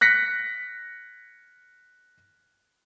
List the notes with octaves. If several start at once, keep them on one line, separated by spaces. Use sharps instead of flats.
F#6 A#6 B6 C#7